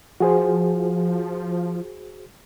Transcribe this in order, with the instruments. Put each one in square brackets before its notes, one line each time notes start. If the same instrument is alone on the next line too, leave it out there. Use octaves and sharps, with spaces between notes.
[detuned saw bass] F3 [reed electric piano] F#4 G#4 C5